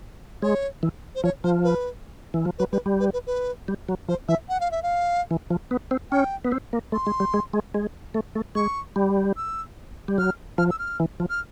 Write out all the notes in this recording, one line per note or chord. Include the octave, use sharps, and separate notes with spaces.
G#3 C#5
E3
C5
F3 C#5
F3 C5
B4
E3
F3
F#3 B4
G3 B4
G3
B4
B4
B4
G3
F#3
F3 C5
E3 E5
F#5
F5
E5
F5
E3
F3
B3
C4
C#4 G5
B3
C4
A#3
A3 C6
G#3
G3
G#3
G#3
G#3
A3
A3
G#3 C#6
G3
E6
G3
F#3 F6
F3 F6
E6
F6
E3
F3
F6